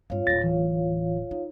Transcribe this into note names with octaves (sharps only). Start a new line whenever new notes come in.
G2 C4 F4 C#5 F5
D1 A2 A6 A#6
E3
D#4